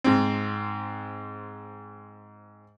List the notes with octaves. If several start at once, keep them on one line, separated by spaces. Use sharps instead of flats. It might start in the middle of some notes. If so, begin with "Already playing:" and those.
G#2 C4